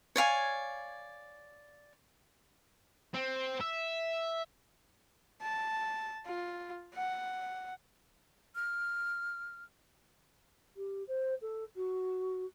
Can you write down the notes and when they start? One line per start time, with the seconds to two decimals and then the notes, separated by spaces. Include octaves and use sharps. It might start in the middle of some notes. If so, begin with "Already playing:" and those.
0.16 C#5 D5 F5 G#5
3.14 C4
3.61 E5
5.42 A5
6.26 F4
6.94 F#5
8.55 F6
10.76 G4
11.08 C5
11.41 A4
11.76 F#4